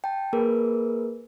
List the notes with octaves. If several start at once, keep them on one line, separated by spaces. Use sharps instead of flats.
G5 A5
A#3 G#4 A#4 B4